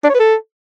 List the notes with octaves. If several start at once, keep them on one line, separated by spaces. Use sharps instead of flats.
D4
C#5
B4
A4